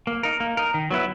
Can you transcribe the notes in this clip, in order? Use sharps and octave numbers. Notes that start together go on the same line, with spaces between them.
A#3
D#4 A#4
A#3
D#4 A#4
D#3
F#3 B3 E4 B4